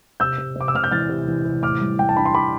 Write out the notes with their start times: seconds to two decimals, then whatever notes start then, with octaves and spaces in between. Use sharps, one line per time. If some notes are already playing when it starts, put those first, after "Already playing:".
0.20 C3 E6 G6
0.38 C3
0.56 C3 D6
0.68 E6
0.74 C3 F6
0.84 G6
0.91 E3 F6 A6
1.09 C3
1.27 E3
1.45 C3
1.62 A2 D6 F6
1.80 G3
1.99 G3 G5
2.09 A5
2.16 D4 B5
2.26 C6
2.34 D4 B5 D6